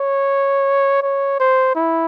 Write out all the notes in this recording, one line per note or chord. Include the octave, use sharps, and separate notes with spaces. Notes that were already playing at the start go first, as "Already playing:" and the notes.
Already playing: C#5
C#5
C5
E4